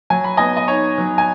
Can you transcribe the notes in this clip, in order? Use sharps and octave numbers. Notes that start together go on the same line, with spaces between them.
F#3 G#5
B5
B3 D#5 G#5
D#5
D#4 C#5
F#3
G#5